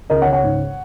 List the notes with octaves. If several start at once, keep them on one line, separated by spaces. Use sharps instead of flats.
C#2 A#4 D#5
C#5 F#5
C#3
C#5 F#5
G#2